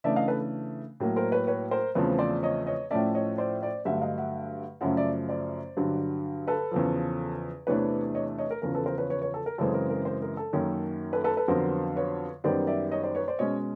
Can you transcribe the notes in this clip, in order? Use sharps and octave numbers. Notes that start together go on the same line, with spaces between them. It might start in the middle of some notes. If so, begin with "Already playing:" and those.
C#3 E3 A3 D4 D5 E5
D#5 F5
A4 B4
A2 F#3 A#3
A#4 C5
B4 C#5
B4 C#5
A#4 C5
E2 C#3 F3 A3 C4 B4 C#5
C5 D5
C#5 D#5
C#5 D#5
A2 F3 A3 C#4 D5 E5
C#5 D#5
C5 D5
C5 D5
G2 D3 F#3 A3 E5 F#5
D#5 F5
E5 F#5
F#2 C#3 F3 A3 C#4 E5 F#5
D5 E5
C5 D5
G2 D3 F#3
A4 B4
E2 C#3 F3
E2 C3 E3 A3 D4 B4 C#5
C#5 D#5
C#5 D#5
A#4
E2 C#3 F3 A#4
A4 B4
A#4 C5
B4 C#5
B4 C#5
B4 C#5
A4
A#4
F#2 C#3 E3 G#3 C4 A4
A#4
A#4
A#4 C5
A#4
A4
F#2 D#3 F#3 A#3 C#4
A4 B4
A4 B4
A4 B4
F2 D3 F#3 B3 A#4 C5
B4 C#5
F#2 D#3 G3 B3 C5 D5
D5 E5
C#5 D#5
C5 D5
B4 C#5
C5 D5
B2 G#3 C#4 C#5 D#5